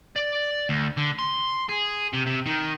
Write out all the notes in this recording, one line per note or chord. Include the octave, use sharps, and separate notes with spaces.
D5
D2
D3
C6
G#4
C3
C3
D#3